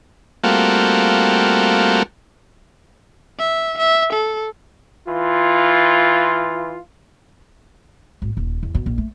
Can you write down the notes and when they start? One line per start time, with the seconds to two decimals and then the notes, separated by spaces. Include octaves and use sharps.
0.44 G3 A3 A#3 C4 F4 F#4
3.39 E5
3.78 E5
4.13 A4
5.06 E3 F4
8.22 G#1
8.37 D#1
8.63 E2
8.75 B2
8.86 A#1
8.98 A3